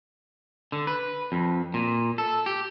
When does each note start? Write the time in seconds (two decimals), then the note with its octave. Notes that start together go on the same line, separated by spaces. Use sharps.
0.72 D3
0.87 B4
1.32 F2
1.74 A#2
2.18 A4
2.46 G4